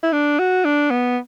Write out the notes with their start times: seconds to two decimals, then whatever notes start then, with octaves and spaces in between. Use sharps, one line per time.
0.03 E4
0.12 D4
0.39 F#4
0.65 D4
0.90 B3